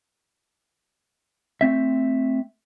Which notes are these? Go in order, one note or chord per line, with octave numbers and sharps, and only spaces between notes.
A3 C4 E5